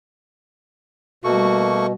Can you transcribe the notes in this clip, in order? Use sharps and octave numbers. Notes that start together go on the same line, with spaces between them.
B2 G3 A3 A#3 F#4 C#6